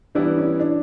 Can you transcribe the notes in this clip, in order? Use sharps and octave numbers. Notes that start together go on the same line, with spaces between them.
E3 G3 B3 D4 E4
C#4
D4